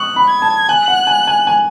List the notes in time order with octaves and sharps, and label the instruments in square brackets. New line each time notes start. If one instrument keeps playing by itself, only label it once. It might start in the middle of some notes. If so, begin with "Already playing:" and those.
Already playing: [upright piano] C#6 D#6 [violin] F#6
[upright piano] B5
[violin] G#6
[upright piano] A5
[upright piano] G#5 [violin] F#6
[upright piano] F#5
G#5
G#5
G#5